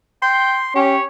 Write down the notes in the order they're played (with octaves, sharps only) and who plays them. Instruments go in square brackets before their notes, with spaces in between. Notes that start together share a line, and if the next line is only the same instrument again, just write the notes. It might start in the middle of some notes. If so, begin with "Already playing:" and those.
[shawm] G5 [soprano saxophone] C6
[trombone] C#4 [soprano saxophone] G4 [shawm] C#5